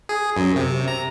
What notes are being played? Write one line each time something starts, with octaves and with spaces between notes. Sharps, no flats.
G#4
F#2
C3
A#5